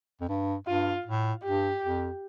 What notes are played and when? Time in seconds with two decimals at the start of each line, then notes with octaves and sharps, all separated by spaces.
0.21 F2
0.29 G2
0.67 G2 F4
1.06 A2
1.44 G2 G4
1.83 F2